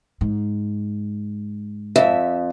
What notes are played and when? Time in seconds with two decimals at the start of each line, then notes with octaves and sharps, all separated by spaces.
0.21 G#2
1.96 F2 E5